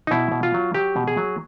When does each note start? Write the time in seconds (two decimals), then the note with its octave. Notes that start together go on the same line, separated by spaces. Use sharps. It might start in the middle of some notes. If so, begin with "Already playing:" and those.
0.07 D#4
0.11 B2 E4
0.32 B2
0.43 F4
0.54 F#3
0.74 F#3 G4
0.96 B2
1.08 G#4
1.17 F#3